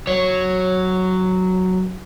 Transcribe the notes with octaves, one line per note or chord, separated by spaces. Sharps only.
F#3 C#5